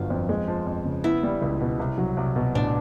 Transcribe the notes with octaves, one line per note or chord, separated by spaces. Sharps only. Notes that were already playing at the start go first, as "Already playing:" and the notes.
Already playing: G1 D3 F#3 F4
F2
G#3
F3
F2
C#3
B3 E4
G3
C#2
B2
C2
F#3
C2
B2
A1 D4